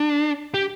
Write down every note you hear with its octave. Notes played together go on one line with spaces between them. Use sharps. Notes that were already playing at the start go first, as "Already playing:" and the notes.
Already playing: D4
G4